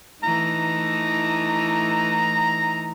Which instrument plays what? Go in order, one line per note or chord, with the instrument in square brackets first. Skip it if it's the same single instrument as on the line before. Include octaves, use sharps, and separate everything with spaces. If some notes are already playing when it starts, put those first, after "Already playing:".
[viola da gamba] E3 A3 D#4 [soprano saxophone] A#5